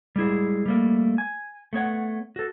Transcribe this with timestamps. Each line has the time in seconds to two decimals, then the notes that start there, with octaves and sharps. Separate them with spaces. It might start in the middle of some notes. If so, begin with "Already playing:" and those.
0.16 G3 G#3 E4 G#4
0.66 G3 A3 A#3
1.18 G#5
1.73 A3 B3 C#5 F#5
2.36 F#4 A4